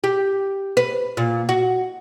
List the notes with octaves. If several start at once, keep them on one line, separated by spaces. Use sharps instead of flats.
G4
B4
A#2
F#4